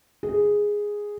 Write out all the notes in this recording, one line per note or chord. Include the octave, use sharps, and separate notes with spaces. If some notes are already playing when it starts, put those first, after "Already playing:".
G#4